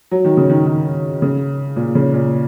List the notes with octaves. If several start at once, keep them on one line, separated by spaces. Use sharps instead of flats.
F#3
D#3
C#3
D#3
D#3
C#3
A#2
C#3
A#2